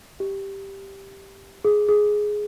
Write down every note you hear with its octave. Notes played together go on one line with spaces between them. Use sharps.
G4
G#4
G#4